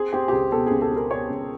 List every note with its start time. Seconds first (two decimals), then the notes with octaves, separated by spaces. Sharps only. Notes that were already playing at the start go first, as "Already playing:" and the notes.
Already playing: C4 G#4
0.13 C4 G4
0.28 G4
0.32 C#2 G#4
0.51 B2 A4
0.67 C#2 G#4
0.82 A4
0.91 C4
0.96 A#4
1.10 B2 C#5
1.30 C#2